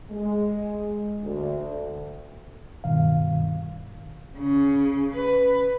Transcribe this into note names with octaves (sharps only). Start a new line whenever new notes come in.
G#3
D2
G2 B2 D#3 F5
C#3
B4